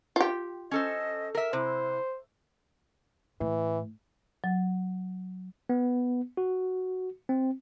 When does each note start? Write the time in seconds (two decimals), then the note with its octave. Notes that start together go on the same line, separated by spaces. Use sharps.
0.16 F4 G4
0.71 C#4 A4 C5 D#5
1.35 A#4 E5
1.53 C3 E4 C5
3.40 A2 E3
4.44 F#3
5.69 B3
6.37 F#4
7.29 C4